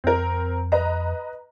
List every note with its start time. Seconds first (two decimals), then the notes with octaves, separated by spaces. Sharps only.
0.04 F2 C4 A#4
0.72 B4 D#5 A#5